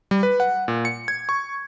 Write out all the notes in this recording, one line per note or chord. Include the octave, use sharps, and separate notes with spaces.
G3
B4
F#5
A#2
C#7
G#6
C#6